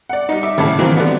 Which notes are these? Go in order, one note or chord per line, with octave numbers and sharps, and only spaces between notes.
D5 F#5
G3 D#4
E5 D6
G#1 A2 C#3 A5
D#3 E3 F#3 A#3 C4
D3 G3 B3